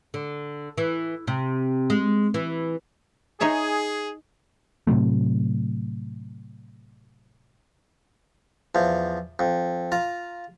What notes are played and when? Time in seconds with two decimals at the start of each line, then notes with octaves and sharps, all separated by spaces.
0.14 D3
0.78 E3
1.27 C3
1.90 G#3
2.34 E3
3.41 D#4 G#4 C#5 E5
4.87 A2 C3 F#3 A3
8.75 E2 F3
9.39 F2
9.92 F4 A#5